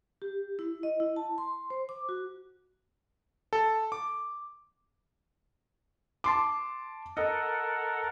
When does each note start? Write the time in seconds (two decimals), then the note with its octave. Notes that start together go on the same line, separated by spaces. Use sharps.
0.22 G4
0.59 E4
0.83 D#5
1.00 E4
1.16 A5
1.38 C6
1.70 C5
1.89 D6
2.09 F#4
3.53 A4
3.92 D6
6.24 A5 C6 D6
7.17 A4 A#4 D#5 F#5